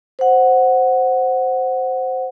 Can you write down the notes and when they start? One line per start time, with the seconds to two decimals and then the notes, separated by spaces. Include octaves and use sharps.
0.19 C5 F#5